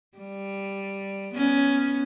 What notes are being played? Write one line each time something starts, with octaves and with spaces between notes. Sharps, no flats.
G3
B3 C#4